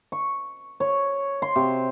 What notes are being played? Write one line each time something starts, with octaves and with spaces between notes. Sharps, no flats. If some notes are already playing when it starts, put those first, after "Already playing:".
C#6
C#5
C6
C3